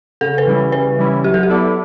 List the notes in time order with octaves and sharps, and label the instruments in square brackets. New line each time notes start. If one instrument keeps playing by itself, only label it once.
[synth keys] C#3 [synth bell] A4
[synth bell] B4
[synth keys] E3 G3 C#4 E4
[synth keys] C#3 [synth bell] B4
[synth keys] E3 G3 C#4 E4
[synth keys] F#3 [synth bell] G4
[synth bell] A4
G4
[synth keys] B3 E4 A4 D5